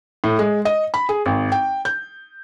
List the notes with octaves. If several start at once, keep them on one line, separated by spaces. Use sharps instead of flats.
A2
G#3
D#5
B5
G#4
G#1
G5
G6